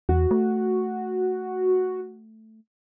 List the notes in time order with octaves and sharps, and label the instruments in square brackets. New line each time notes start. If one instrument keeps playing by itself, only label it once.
[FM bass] E2 [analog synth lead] F#4
[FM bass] A3